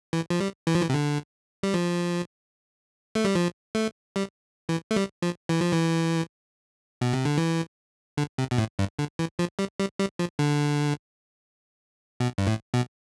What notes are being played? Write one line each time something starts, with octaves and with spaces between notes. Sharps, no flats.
E3
F3
G3
E3
F3
E3
C3
D3
G3
F3
A3
G3
F3
A3
G3
E3
A3
G3
F3
E3
F3
E3
B2
C3
D3
E3
D3
C3
B2
A2
G2
D3
E3
F3
G3
G3
G3
F3
D3
B2
G2
A2
B2